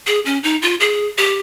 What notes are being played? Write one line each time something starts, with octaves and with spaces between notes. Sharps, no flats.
G#4
C#4
D#4
F4
G#4
G4